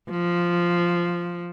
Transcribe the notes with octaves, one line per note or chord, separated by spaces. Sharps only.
F3